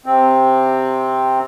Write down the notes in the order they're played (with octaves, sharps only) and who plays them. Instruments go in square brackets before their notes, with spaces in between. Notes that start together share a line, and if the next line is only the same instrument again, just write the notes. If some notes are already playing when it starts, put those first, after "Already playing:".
[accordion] C3 C4